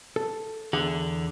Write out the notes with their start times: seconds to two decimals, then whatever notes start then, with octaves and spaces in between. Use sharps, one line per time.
0.16 A4
0.73 E2 D3 G#4 F#5